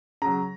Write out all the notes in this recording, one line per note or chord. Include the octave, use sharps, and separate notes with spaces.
C#3 F#3 A#5